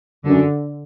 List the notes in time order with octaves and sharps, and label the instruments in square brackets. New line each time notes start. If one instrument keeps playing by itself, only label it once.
[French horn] F#2 [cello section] D3